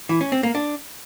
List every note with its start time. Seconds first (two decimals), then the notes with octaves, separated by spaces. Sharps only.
0.09 E3
0.21 C#4
0.32 C4
0.43 A#3
0.55 D4